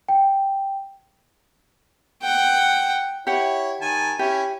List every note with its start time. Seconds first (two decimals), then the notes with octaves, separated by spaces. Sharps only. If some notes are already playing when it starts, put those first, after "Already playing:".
0.08 G5
2.23 F#5 G5
3.27 E4 G4 C#5 F#5
3.81 D#3 G#5 A5
4.19 C#4 E4 G4